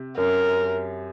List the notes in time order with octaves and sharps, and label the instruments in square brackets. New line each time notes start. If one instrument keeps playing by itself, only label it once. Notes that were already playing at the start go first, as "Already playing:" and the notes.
Already playing: [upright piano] C3
[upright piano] F#2 [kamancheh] A#4